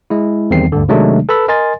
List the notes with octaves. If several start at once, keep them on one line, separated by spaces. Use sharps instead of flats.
G#3 E4
E2 D#3 G3 C4 C7
D2 G2 D3
C3 D#3 F#3 G#3 A3 D4
A4 B4 A5 B5 E6
A#4 D#5 G#5 C6 A6